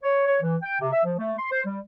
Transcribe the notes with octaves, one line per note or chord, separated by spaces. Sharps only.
C#5
C#5
E3
G5
C3
E5
F3
A3
C6
C5
G3